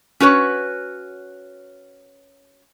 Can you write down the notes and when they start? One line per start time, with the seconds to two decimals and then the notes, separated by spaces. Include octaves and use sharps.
0.20 C#4 F#4 B4 C#5